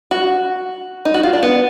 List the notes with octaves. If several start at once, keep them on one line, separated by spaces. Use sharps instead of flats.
F#4
D#4
F#4
F4
D4
B3